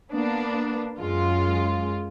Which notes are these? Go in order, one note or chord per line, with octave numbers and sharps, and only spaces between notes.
A#3 B3 D4
F#2 G#3 F4